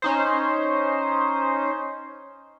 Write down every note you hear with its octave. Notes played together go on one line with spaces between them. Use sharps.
C#4 D#4 C5